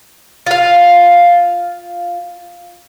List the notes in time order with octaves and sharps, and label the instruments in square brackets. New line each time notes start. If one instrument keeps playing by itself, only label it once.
[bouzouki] F4 F5